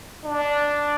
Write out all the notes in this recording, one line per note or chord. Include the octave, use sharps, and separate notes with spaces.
D4